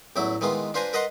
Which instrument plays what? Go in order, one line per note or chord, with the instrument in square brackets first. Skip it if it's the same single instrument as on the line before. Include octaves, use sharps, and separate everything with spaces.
[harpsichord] A1 E2 F#3 E4 D6
D#3 E3 G#3 B3 F4
D4 F4 B4 C5 G#5 A#5
A#4 B4 D#5 F#5 A#5 C6